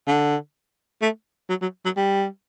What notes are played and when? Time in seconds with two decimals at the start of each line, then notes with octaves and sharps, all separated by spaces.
0.07 D3
1.02 A3
1.49 F#3
1.61 F#3
1.85 F#3
1.96 G3